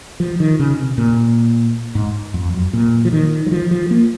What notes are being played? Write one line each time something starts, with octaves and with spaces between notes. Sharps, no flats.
F3
D#3
C#3
C3
A#2
G#2
F2
F#2
A#2
F3
D#3
F#3
F3
F3
A#3